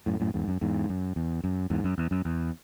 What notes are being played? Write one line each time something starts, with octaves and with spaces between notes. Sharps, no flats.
F#2 A2
F#2 A2
E2 G#2
F#2
E2 G#2
F#2
E2
F#2
E2 G#2
F#2
E2
F#2
E2